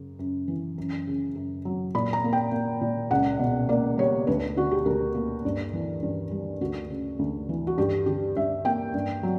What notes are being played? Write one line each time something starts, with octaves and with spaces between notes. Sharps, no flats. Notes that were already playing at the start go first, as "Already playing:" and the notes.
Already playing: F#2 C#3
F#2
E3
F#2
C#3
F#2
F#3
A#2 B5
A#5
A#3
G5
A#3
A#2
C#2 F#5
B2
A#3 D5
G3 C#5
D2 B4
D3 F#4
G4
D2 A#4
A#3
G2
E3
G2
G3
D2 F#4
C#3
D2
E3
F#4
G2 G4
D3 G4
G2 E5
A#3 G5
G2
F#3